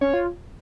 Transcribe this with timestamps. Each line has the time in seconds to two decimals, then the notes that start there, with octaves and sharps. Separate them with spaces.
0.01 C#4 C#5
0.14 F4